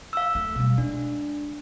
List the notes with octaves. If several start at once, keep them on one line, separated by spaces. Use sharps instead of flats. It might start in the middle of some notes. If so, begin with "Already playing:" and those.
F5 E6
A3
B2 G3
G#3 D4